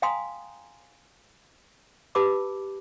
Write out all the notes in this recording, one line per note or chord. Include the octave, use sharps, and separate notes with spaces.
F5 G5 G#5 A#5 C6 D#6
G4 B4 A5 B5 D6 E6